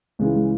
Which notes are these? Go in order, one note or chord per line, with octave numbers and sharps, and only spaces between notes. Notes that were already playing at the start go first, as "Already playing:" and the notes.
C#2 C#3 E3 G#3
G#3